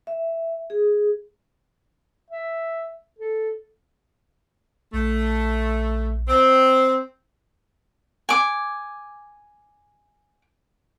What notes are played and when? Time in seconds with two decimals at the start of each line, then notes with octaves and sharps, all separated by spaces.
0.07 E5
0.70 G#4
2.30 E5
3.19 A4
4.93 A#1 A3
6.28 C4
8.29 G#5 D6